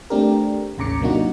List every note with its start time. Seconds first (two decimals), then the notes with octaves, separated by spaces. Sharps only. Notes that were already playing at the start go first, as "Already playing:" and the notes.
0.10 A3 C4 D4 G4 A#4
0.78 A1 D#2 C#3 A#5 D6 C#7
1.01 C3 F#3 A#3 D4 D#4 F#4